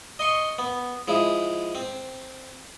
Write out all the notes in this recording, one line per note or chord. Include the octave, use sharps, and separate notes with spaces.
D#5 C6 C#6
B3
F3 G#3 E4
C4